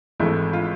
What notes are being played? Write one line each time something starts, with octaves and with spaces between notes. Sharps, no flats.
G#1 G#2 E3 A3 E4
F4